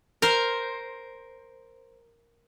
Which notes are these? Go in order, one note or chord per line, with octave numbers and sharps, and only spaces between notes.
A#4 C5